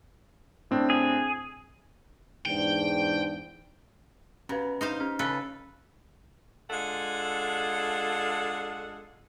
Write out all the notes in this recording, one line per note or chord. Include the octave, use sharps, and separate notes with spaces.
A2 C4 D4
G#4
E2 G#2 D4 G5
B2 C#4 B4
D#4 C5 F5
C#4 F6
C#3 A4 B4
G#3 D4 F4 A4 F#5